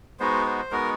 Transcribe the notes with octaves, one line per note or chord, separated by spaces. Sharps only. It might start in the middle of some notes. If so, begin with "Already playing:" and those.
G#3 B3 D#4 F#4 C5
C5
G#3 B3 D#4 F#4 A#4